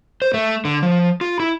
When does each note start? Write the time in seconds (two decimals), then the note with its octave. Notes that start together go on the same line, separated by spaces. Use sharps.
0.22 C5
0.34 A3
0.65 D3
0.82 F3
1.21 F4
1.40 E4